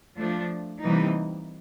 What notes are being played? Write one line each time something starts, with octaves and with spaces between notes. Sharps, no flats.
F3 A3 D4
C3 E3 G3 A#3 D#4